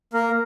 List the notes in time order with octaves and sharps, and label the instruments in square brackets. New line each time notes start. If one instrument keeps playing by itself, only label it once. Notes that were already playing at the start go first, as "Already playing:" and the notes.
[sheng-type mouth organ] A#3 A#4